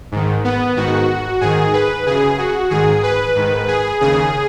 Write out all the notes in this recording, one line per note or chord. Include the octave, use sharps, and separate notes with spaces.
G#2 D#3
B3
G#2 D#3 F#4
G#2 D#3 G#4
B4
F#2 C#3 G#4
F#4
G#2 D#3 G#4
B4
G#2 D#3
G#4
D#2 C#3 G#4